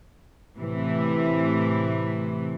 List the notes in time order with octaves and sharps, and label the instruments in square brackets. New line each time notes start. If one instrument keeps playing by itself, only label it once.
[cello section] A2 C3 E3